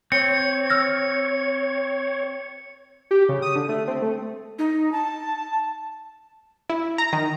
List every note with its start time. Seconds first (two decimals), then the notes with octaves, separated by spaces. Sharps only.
0.12 C4 C#5 C#7
0.70 E6 F6 A#6
3.11 G4
3.29 C#3
3.42 D#6
3.56 D3
3.69 A3
3.88 C4
4.02 A3
4.59 D#4
4.92 A5
6.69 E4
6.98 A#5
7.13 D#3